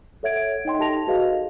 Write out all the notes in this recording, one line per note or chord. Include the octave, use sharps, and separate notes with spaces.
A4 C#5 E5 F#5 G#6 D7
D#4 D#5 G5 C6
D#4 G4 A4 A5 A#6 F7
F#4 G#4 B4 D#5 F5